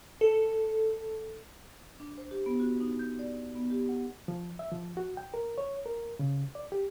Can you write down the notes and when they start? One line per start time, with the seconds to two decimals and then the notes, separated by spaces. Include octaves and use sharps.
0.21 A4
2.00 D4
2.18 C5
2.31 G4
2.46 B3
2.60 F#4
2.80 D#4
2.99 G6
3.19 D5
3.55 B3
3.70 G4
3.89 F#5
4.28 F3
4.59 E5
4.72 F3
4.97 F#4
5.17 G5
5.34 A#4
5.58 C#5
5.86 A#4
6.19 C#3
6.55 D5
6.72 G4